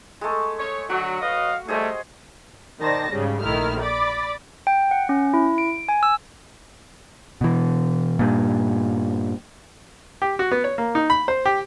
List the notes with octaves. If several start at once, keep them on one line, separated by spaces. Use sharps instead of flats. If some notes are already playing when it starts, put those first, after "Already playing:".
G#3 A3
C#5
D3 F#3 F#4
F#3 B4 D#5 F5
G3 A3 G#4 C5 D#5
D#3 C5 D5 A5 A#6
G#2 C#3 G3
A#1 D#3 A3 E4 F6
D5 B5 D6 A6
G5
F#5
C#4
E4
D7
G#5
E6
B2 E3
G2 A#2
G4
F#4
B3
C#5
A#3
D#4
B5
C5
G4